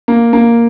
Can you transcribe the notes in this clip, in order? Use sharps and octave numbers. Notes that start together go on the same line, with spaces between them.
A#3
A#3